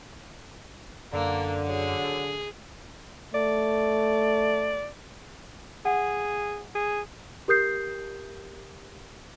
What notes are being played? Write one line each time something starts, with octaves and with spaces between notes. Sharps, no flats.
F#2 D3 A#3 D4
F#3 G#4
A3 D5
G#4 F#5
G#4
G4 A#4 D#6 G6 C7